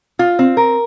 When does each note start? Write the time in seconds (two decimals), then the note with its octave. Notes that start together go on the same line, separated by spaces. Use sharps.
0.19 F4
0.39 C4
0.57 A#4